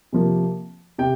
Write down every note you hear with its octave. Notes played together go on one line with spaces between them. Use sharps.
C3 F3 A#3
C3 G5